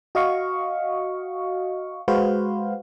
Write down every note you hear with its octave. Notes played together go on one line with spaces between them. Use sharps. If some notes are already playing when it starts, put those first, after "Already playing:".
F#4 D#5 F5 C#6
G#3 F#4 B4 C5 F5